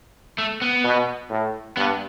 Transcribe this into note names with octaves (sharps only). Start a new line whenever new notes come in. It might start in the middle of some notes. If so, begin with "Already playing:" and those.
A3
B3
B2
A2
G2 B3